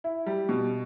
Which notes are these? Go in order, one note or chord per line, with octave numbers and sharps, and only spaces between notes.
E4
G3
B2